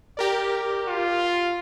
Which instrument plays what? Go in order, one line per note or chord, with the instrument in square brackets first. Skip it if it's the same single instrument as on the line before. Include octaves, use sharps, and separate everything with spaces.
[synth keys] G4 A#4 D5
[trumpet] F4